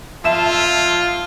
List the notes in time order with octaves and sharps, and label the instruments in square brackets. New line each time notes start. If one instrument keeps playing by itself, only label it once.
[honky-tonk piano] F2 E5 E7 [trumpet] F4